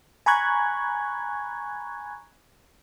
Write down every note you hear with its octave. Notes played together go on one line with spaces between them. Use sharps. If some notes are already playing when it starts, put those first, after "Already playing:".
G#5 A#5 B5 C#6 F#6 G#6